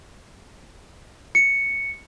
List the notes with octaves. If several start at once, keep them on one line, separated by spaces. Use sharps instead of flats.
C#7